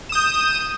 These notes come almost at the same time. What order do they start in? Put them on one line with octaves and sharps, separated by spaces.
E7 D#6 G6